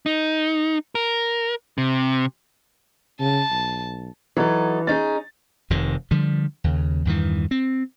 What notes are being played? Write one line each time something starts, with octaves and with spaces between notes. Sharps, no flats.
D#4
A#4
C3
C#3 A5
B1
E3 F#3 D#4 A4
C#4 D#4 G#4 A6
F1 F2 C3 D#3
D3 F3 G3
D#2 C#3
E2 G2 D#3 E3
C4